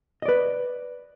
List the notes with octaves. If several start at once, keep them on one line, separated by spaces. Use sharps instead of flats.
B4 D5 D#5